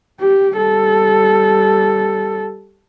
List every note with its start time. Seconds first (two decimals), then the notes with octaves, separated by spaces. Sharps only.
0.20 G4
0.54 G3 A4